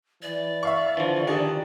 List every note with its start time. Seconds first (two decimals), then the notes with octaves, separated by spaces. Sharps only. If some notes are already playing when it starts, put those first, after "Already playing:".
0.22 E3 D5
0.63 E5 F5 C#6
0.97 D3 E3 F3
1.27 D#3 D4 G4 G#4